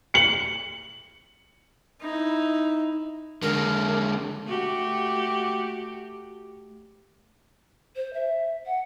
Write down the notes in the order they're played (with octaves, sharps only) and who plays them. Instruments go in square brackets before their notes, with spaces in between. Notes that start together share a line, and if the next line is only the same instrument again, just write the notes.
[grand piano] C#7 F#7
[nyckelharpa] D#4 E4
[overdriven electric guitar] D3 G#3 [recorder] A#4
[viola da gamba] A3 F#4 G4
[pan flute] C5
E5
F#5